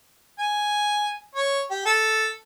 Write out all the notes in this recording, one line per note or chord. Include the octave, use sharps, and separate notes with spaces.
G#5
C#5
G4
A4